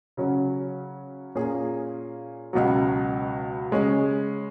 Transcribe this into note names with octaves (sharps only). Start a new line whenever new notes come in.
C#3 F#3 C#4
A#2 A#3 C#4 G#4
C#2 B2 F#3
C#3 G#3 C#4 G#4